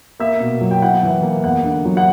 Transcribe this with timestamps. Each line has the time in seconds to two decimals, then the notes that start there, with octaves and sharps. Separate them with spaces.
0.20 A#3 E5
0.40 B2
0.61 F#3
0.71 G5
0.82 E4 F#5
1.03 E3
1.23 A#3
1.44 E2 F#5
1.64 D3
1.85 F#3
1.97 F#5